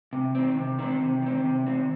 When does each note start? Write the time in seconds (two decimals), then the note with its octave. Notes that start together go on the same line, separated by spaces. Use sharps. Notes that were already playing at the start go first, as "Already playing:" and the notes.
0.13 C3
0.35 D#3 C4
0.57 C3
0.79 D#3 C4
1.01 C3
1.22 D#3 C4
1.44 C3
1.66 D#3 C4